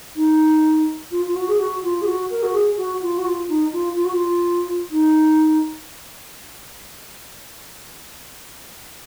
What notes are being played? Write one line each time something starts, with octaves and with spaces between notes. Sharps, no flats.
D#4
F4
F4
F#4
G#4
F#4
F4
G#4
F#4
A#4
F#4
G#4
F#4
F4
F#4
F4
D#4
F4
F4
F#4
F4
D#4